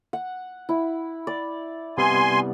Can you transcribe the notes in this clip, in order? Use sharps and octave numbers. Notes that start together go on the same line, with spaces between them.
F#5
E4
D5
C3 G3 B3 G#5 C6